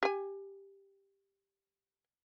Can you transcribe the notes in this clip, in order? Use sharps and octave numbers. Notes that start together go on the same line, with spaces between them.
G4 G#5